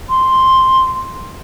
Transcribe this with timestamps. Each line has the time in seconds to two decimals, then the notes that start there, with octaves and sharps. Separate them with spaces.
0.09 C6